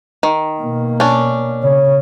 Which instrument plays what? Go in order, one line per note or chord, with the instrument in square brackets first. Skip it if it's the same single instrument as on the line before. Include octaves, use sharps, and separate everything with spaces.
[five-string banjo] D#3
[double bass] B2 A#3
[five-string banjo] C#4 D4
[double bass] C#3 [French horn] C#5